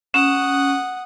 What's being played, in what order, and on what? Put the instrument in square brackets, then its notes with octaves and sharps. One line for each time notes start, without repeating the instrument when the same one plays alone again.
[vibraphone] C#4 [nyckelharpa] F#5 D#6